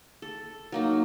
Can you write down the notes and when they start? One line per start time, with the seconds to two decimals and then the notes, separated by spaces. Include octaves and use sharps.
0.22 A4
0.72 F#3 A#3 D#4